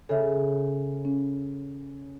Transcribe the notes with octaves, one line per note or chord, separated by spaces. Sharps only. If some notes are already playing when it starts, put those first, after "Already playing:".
C#3 A4 E5
C#4